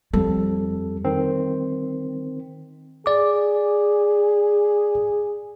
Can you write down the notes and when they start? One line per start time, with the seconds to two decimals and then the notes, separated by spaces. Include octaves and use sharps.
0.13 F2 G3 A4
1.05 D#3 C4
3.06 G#4 D5 D6